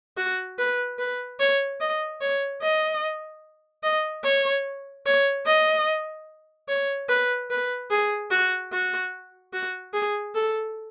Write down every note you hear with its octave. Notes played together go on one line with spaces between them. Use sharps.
F#4
B4
B4
C#5
D#5
C#5
D#5
D#5
C#5
C#5
D#5
C#5
B4
B4
G#4
F#4
F#4
F#4
G#4
A4